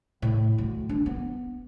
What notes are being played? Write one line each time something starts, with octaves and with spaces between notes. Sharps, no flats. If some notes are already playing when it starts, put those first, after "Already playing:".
A2
D2
D4
B3